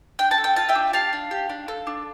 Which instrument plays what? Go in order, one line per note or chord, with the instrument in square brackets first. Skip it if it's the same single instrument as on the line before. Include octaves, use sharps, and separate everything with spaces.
[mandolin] D4 G5
A5
A4
G5
F4 A5
E5 G5
D4
G4 F5 A5
D4
G4
D4
A4
D4